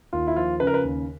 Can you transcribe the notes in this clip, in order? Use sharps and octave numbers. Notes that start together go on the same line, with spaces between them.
D#2 F4
E4
F3 F4
C#3 B4
A#4
B4
D#2